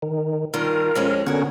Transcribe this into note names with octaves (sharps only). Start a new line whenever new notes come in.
D#3
G2 D#3 F4 A#4
F2 G#3 C#4
D3 B3 C#4 F#4 A#4